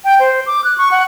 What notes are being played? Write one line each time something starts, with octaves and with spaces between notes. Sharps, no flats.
G5
C5
D6
F#6
C#6
F#5